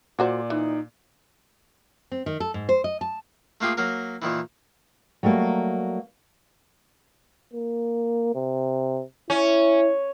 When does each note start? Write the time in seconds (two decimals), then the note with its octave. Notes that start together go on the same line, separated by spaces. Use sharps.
0.19 A#2 F#3 F#4 C5 D5
0.50 E3 D#4
2.12 C4
2.26 D#3
2.40 A4
2.54 G#2
2.69 C5
2.84 D#5
3.01 A5
3.61 A3 A#3 F4 G4 G#4
3.77 F#3 A#3 A#4
4.22 A#2 D#3 E3
5.23 F#3 G3 A3 A#3
7.53 A#3
8.35 C3
9.30 C#4 E4